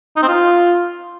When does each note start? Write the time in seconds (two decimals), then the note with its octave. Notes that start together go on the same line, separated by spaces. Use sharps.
0.16 D#4
0.22 C4
0.28 F4